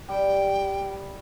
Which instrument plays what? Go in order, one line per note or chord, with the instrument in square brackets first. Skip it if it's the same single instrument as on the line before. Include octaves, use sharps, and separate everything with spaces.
[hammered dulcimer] G3 [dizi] G5